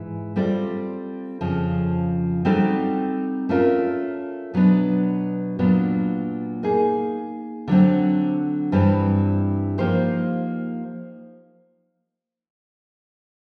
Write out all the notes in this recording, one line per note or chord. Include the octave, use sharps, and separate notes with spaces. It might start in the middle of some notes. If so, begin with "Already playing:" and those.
Already playing: G#2 E3
G3 C4 F4 A4 D5
F2 C#3 F3
G3 C4 D#4 F#4 A4
A3 C#4 F4 A#4
B2 F#3 B3 D4
A#2 F#3 B3 D4
A#3 D#4 G#4
D3 F#3 A3 C4
G2 E3 G3 C4
F3 A#3 D#4 G4 C5